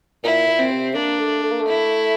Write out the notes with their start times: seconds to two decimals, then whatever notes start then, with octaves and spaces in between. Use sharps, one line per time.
0.24 A#2 E4
0.48 A#2
0.59 C4
0.71 C3
0.95 A#3 D4
1.19 A3
1.44 A3
1.51 A#3
1.60 A3
1.67 E4